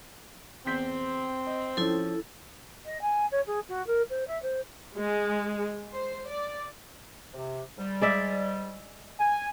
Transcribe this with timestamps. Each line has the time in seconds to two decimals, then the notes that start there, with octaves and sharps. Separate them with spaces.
0.66 E2 C4 G6 B6
1.46 D#5
1.77 F3 C#4 E4 A4
2.85 D#5
3.01 G#5
3.31 C#5
3.47 G#4
3.68 F#4
3.87 A#4
4.10 C5
4.27 E5
4.42 C5
4.98 G#3
5.92 C5
6.28 D5
7.33 C3
7.78 G#2 G3
8.01 G#3 D5 E5
9.19 G#5